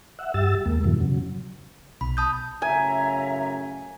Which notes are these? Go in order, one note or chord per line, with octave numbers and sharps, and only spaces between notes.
E5 F#5
G2 G4 E6 A6
D#2 G#3 A#3
F2 G#2 B2 E3 F#3
C#3 F#3
B1 B5
A5 D#6 G6
F#2 A2 C#3 E5 G#5 A#5